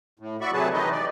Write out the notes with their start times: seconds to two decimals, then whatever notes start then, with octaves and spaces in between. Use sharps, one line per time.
0.20 A2
0.41 F#4 D5 E5 B5 C#6
0.53 C3 F#3 A3 G#4 B4 A5
0.73 D#3 E3 D#4 B4 D#5
0.92 D5